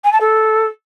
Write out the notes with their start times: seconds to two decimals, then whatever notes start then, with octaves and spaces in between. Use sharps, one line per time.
0.04 G#5
0.13 A5
0.21 A4